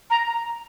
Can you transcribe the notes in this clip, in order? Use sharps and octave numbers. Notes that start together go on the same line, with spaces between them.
A#5